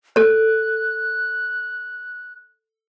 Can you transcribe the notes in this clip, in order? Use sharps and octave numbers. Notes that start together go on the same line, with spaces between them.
A4 C#5 F#6